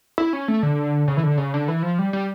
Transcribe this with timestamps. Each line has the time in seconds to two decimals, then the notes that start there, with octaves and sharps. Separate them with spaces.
0.18 E4
0.33 C#4
0.48 A3
0.63 D3
1.08 C#3
1.17 E3
1.23 D3
1.38 C#3
1.54 D3
1.68 E3
1.83 F3
1.99 G3
2.13 G3